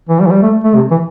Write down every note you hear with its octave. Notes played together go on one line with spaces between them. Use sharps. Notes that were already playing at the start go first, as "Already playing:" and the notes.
E3
G3
E3
G3
A3
A3
C3
E3